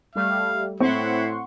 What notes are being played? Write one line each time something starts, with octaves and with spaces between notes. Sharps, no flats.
G3 A3 F5
A2 C4 E4 F#5 C6 C#6